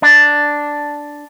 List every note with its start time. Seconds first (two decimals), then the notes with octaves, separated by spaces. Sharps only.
0.02 D4